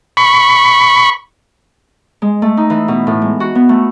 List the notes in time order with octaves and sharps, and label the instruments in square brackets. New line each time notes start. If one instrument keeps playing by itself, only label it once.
[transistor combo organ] B5 C#6
[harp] G#3
A3
D#4
E3
B2
A2
G#3
F#4
B3
A3